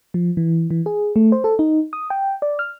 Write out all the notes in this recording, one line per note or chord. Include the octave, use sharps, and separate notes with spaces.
F3
E3
E3
G#4
A3
C5
A4
D#4
D#6
G5
D5
F6